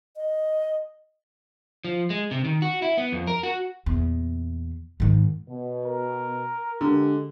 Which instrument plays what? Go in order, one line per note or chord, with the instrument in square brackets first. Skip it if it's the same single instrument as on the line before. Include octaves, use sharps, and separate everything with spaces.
[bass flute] D#5
[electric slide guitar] F3
G#3
C3
D#3
F#4
E4
B3
F2
A#4
F#4
[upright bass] E2 A#2
G#2 D#3
[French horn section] B2
[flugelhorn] A#4
[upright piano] D3 [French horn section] G#3 G4